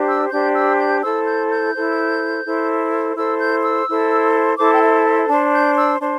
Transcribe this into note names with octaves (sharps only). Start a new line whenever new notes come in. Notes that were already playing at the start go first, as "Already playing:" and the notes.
Already playing: D4 G4 C5
E6
D4 G4 C5 G6
E6
G6
E4 A4 C5 E6
G6
G6
E4 A4 C5
E4 A4 C5
E4 A4 C5 E6
G6
E6
E4 A4 C5
E4 A4 C5 D6
G5
E5
E5
D4 C5 A5
G6
E6
D4 C5